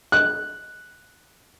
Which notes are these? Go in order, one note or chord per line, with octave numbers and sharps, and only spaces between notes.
F#6